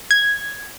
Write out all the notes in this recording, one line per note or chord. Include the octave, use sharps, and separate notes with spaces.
G#6